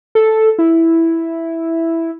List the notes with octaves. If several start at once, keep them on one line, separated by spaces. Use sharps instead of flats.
A4
E4